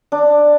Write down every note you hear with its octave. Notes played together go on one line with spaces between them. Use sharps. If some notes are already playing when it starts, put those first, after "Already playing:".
D4